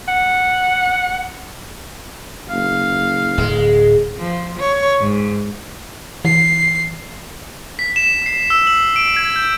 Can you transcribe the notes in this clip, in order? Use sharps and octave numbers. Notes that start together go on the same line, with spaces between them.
F#5
F#1 F5
D1 G#3
F3
C#5
G#2
E3 C7
B6
E7
C7
E6
F#7
D7
G#6
G6